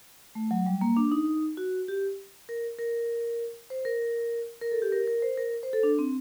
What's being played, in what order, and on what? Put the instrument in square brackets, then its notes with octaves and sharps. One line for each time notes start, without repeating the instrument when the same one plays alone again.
[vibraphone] A3
F#3
G3
A#3
D4
D#4
F#4
G4
A#4
A#4
C5
A#4
A#4
A4
G4
A#4
A#4
C5
A#4
C5
A4
D4
C4